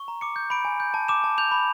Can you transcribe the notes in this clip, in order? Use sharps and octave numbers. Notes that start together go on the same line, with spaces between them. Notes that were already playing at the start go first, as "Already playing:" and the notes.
Already playing: C#6
A#5
D6 C#7
G6
B5 D7
G#5
G6
A5
D6 E7
A5
G6 F7
B5